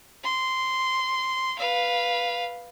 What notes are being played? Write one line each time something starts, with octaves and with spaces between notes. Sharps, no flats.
C6
B4 F5